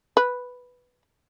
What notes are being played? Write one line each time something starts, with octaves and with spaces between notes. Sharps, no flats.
B4